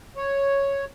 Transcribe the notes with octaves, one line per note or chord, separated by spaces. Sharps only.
C#5